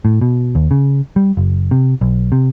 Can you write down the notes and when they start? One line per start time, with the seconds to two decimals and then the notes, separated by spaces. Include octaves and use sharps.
0.05 A2
0.21 B2
0.55 D#2
0.71 C#3
1.16 G3
1.37 F#1
1.71 C3
2.01 B1
2.32 C3